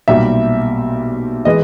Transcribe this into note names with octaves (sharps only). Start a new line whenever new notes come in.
B1 A#2 G3 E5
E3 G#3 D#5